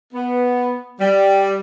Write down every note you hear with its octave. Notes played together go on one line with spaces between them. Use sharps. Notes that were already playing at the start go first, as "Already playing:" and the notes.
B3
G3